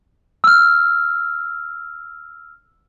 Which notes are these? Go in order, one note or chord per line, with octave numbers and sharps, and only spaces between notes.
E6 F6